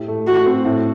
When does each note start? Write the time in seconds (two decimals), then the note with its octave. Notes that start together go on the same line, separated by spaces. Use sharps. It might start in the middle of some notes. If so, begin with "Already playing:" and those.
Already playing: A2 G4
0.08 A3
0.27 A3 F#4
0.46 C4
0.65 A2